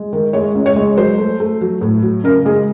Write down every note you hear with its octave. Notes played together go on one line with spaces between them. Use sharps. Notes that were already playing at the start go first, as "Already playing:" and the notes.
Already playing: G#3
D#3
G#3 C#5
C#2
C#5
G#3
F#3 C5
A3
A3
F#3
A2
F#3
C#3 A#4
G#3 G#4